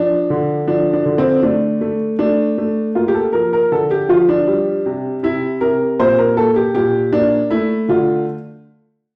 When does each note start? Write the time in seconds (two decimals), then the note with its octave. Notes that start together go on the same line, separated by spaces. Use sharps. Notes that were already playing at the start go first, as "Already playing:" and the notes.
Already playing: F3 D4
0.30 D3
0.67 F3 D4
0.93 D4
1.05 D3
1.18 C4
1.43 A3 D4
1.81 A3
2.19 A3 D4
2.58 A3
2.95 A#3 F4
3.08 G4
3.14 A4
3.33 F3 A#4
3.53 A#4
3.72 D3 A4
3.91 G4
4.09 F3 F4
4.29 D4
4.47 G3
4.86 C3
5.23 C3 E4
5.61 C3 A#4
6.00 A#2 C5
6.18 A#4
6.37 A#3 A4
6.56 G4
6.75 A#2 G4
7.13 A#3 D4
7.50 A3 E4
7.89 D3 F4